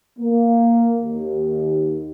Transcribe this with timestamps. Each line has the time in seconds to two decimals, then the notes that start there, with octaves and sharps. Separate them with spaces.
0.19 A#3
1.01 D#2